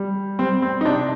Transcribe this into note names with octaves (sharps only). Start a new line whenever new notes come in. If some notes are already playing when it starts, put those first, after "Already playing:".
Already playing: G3
G3 C4
C4
D#4
C3 D4